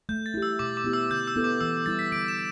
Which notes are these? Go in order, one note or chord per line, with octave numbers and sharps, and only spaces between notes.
A3 G6
A6
E4 G4
E6
B2 D6
D6
B3 E4 G4
E6
D3 G6
E6
B3 E4 A4
D6
E3 E6
G3 E4 A6
B6
D3 D7
E7